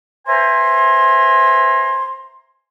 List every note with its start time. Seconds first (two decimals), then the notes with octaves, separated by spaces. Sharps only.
0.27 B4 C5 E5 G#5 A#5 C6